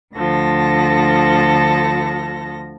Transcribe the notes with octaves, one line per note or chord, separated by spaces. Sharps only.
D2 D3 F3 A4 A#6